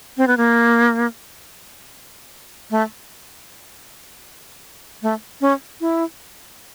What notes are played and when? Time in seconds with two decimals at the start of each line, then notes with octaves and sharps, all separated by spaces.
0.17 C4
0.27 B3
0.37 A#3
2.71 A3
5.02 A3
5.41 C#4
5.81 E4